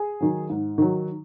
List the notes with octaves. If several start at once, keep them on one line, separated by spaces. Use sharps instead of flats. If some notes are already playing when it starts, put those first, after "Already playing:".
Already playing: G#4 G#5
D#3 F#3
G#2
D#3 F#3